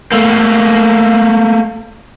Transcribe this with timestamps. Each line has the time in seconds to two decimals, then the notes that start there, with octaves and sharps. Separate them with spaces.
0.12 A3 A#3